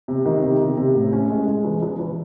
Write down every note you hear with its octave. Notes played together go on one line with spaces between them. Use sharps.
C3
D#3
C3
C3
C3
A2
C#4
G#3
G#3
E3
E3
E3